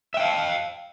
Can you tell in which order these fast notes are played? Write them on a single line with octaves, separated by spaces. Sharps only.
E5 G5 F5